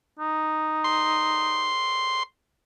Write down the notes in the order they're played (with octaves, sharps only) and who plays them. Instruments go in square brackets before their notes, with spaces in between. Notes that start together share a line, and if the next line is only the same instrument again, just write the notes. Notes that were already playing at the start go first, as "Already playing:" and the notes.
[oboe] D#4
[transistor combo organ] C6